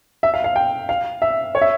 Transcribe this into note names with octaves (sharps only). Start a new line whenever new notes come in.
E5
F5
F5
G5
F5
E5
C#5
E5